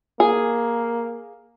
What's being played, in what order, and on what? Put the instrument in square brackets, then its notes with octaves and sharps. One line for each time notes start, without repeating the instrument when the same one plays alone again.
[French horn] A#3 [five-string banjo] G#4